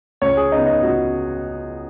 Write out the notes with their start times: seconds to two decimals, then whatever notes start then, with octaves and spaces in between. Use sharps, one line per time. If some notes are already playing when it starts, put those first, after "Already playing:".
0.22 C#2 C#5
0.37 G#4
0.51 C#3 B3 D#4
0.66 D#4
0.83 C#2 F#4